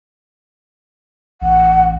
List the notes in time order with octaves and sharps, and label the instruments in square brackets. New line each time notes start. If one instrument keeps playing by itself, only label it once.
[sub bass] A1 [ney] F#5